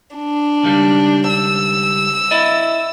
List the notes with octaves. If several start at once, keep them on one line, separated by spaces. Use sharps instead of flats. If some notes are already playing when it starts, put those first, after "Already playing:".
D4
C#2 D#3 G3
E6
E4 D5 D#5